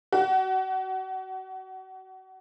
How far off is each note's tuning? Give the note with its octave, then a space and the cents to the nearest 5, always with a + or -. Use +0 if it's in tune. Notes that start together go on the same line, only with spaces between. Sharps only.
F#4 +30